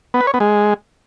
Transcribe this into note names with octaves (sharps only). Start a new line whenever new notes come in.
B3
B4
C#5
B3
G#3